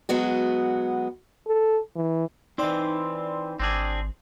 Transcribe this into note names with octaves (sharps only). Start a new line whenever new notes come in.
F#3 G#3 B3 F#4
A4
E3
E3 C4 D#4 D5 C6
G#1 C4 D4 G#4